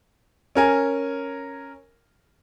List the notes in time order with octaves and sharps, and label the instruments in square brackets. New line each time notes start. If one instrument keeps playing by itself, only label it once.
[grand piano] C#4 A#4 G#5